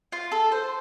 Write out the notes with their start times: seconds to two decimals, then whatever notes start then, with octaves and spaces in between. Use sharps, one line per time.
0.12 F4
0.32 A4
0.52 C5